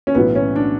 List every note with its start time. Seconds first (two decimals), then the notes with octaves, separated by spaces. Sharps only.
0.07 C#4
0.15 B1 A2 E3 B3
0.35 C#4
0.56 D4